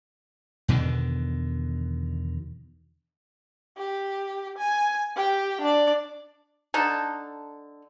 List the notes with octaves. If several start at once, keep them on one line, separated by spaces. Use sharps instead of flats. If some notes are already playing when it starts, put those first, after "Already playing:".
E2 B2 D3 D#3
G4
G#5
G4 G5
D4 D5
D3 D#4 A4